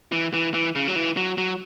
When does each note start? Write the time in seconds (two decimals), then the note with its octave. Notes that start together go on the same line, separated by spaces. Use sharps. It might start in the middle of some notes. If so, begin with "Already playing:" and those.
0.12 E3
0.34 E3
0.54 E3
0.75 C#3
0.88 F#3
0.96 E3
1.17 F#3
1.38 F#3